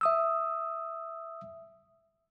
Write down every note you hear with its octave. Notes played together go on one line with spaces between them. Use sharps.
E5 D#6 E6